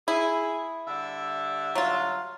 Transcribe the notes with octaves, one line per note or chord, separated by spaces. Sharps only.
E4 G#4
D3 G3 E5
F#3 F4